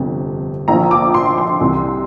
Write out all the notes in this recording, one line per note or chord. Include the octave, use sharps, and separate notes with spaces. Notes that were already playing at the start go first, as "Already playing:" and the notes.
Already playing: G1 F2 C3
A#1 A#2 F3 A#5
D6
C6
C6
C2 C3 E3